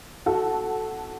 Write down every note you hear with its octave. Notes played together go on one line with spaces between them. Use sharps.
F#4 A4